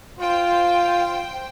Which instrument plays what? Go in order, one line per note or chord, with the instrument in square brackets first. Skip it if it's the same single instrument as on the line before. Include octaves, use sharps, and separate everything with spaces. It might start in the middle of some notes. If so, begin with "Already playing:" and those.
[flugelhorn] F4 [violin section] C5 G5